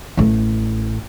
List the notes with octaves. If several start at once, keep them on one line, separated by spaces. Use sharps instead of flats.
A1 A3